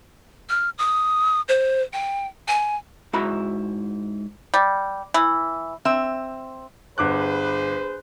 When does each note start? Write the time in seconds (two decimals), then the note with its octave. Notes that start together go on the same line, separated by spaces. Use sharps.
0.49 F6
0.78 D#6
1.49 C5
1.93 G5
2.48 G#5
3.13 G#2 E4 F#4 A#5 B5
4.54 G3
5.14 E3
5.85 C4 E5
6.98 G1 G#4 B4 C5 D6 F#6